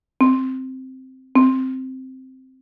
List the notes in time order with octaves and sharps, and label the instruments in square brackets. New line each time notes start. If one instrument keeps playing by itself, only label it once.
[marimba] C4
C4